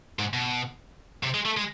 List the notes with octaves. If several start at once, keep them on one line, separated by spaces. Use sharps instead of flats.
G#2
B2
C3
G#3
A3
G#3